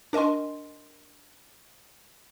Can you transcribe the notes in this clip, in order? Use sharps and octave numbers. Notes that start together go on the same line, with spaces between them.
D4 A#4 D#5 G#5 C6